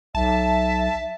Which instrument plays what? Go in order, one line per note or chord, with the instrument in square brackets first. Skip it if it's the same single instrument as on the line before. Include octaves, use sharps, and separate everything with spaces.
[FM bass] B1 [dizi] E5 [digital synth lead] A5